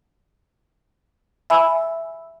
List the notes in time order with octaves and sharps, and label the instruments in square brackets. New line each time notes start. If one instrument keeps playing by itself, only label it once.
[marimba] E5 G#5 B5 E6